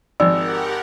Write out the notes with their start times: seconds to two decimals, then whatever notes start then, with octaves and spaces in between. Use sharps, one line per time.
0.20 G#1 F3 G4 A#4 D5 F#5 E6